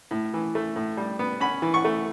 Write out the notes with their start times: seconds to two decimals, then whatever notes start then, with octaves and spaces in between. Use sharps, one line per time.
0.11 A2
0.34 E3
0.55 A3
0.76 A2
0.97 G3
1.19 B3
1.40 C#4 B5
1.62 E3
1.74 C#6
1.85 A3